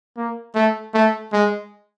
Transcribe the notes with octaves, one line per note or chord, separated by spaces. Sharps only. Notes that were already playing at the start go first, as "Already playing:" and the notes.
A#3
A3
A3
G#3